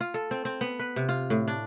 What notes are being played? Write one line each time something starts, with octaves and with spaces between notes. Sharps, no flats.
F4
A4
C4
C4
B3
B4
C3
F4
A2
D4